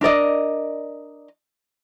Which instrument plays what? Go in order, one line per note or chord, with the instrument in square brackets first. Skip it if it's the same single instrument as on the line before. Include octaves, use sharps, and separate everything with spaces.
[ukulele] D4 A#4 D5 D#5